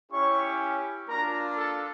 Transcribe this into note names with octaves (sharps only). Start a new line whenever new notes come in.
C#4 E4 G4 C#5 C#6
A#3 D4 F4 A#4 A#5
A4 A5